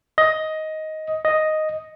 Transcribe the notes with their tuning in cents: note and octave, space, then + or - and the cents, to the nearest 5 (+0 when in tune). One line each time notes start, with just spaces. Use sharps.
D#5 +10
D#5 +0